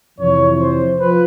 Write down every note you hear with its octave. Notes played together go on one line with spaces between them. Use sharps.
F2 C3 E3 C#5
C5
F3 B4